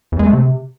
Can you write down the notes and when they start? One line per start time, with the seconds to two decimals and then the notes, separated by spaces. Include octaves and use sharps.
0.12 E2
0.19 G#3
0.26 A3
0.33 C3